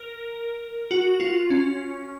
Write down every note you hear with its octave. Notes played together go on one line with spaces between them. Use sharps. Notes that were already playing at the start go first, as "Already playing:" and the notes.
Already playing: A#4
F#4
F4
C#4